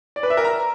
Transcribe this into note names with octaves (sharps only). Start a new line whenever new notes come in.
D5
B4
E5
A#4
A#5